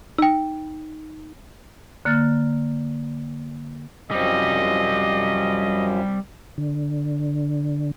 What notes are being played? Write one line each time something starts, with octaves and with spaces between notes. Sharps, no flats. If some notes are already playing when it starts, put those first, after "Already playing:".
D#4 G5 E6
D3 A#3 F6 A6
F#2 F3 G3 C4 D#5
D3